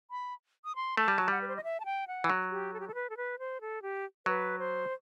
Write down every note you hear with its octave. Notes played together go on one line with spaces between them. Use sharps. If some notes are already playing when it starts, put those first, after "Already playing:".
B5
D#6
C6
A3 A5
G3
F#3
G3 F#5
B4
C5
D#5
E5
A5
G5
F#5
E3
F#3
G4
A4
G4
A4
B4
A4
B4
C5
A4
G4
F#3 B4
C5